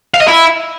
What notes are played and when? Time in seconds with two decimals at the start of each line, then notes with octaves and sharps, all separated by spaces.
0.14 F5
0.21 D#5
0.28 E4